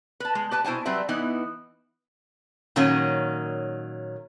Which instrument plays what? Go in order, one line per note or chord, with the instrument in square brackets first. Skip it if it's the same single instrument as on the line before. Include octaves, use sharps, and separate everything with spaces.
[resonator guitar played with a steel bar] B4 A5
G#3
G4 B4 A5
B2 E4 C5 G#5 A5
F#3 G3 C4 B4 E5
E3 B3 D#4 E4
A#2 D#3 F#3 A#3 C#4